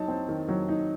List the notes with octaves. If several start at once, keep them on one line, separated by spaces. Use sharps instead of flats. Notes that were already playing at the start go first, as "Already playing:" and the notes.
Already playing: F#3 D#4 A5
C4
D#3
F#3
D#4